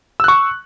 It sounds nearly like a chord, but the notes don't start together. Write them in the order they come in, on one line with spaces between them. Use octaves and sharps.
E6 F#6 C#6